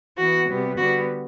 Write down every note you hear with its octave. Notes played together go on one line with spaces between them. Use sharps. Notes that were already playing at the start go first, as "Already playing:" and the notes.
E3 B3 F#4
C3 G3 B3
D3 G3 B3 F#4